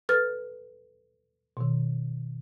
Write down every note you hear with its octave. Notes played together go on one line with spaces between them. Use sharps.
A4 B4 F6 A6
B2 D#3